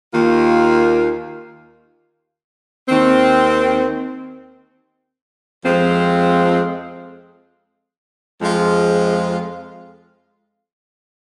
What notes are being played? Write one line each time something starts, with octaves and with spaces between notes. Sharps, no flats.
D#2 D#3 A#3 F4
D#2 D#3 C4
F2 F3 G#3 C4 F4
F2 F3 G#3 F4